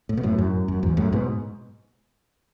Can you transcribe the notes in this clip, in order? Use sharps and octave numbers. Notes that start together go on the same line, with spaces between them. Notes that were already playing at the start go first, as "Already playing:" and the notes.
A2
B2
F#2 A2
F#2
F#2
E2 G#2
F#2 A2
G#2 B2